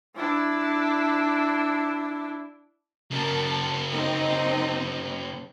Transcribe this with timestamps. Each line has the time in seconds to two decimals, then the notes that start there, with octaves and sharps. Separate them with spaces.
0.16 D4 E4
3.11 C#3 A#3 A#4 A5
3.89 C4 D#4 D#5